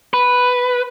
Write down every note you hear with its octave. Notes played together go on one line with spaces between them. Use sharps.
B4